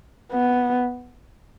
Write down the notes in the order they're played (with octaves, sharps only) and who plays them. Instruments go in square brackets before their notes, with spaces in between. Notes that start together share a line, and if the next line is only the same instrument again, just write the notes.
[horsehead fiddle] B3